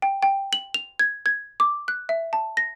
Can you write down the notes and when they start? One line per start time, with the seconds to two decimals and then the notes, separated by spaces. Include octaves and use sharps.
0.02 G5
0.23 G5
0.53 F#7
0.74 F7
0.99 G#6
1.26 G#6
1.60 D6
1.88 F#6
2.09 E5
2.33 A5
2.57 A#6